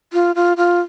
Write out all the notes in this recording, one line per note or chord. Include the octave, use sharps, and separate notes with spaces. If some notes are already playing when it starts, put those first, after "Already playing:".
F4
F4
F4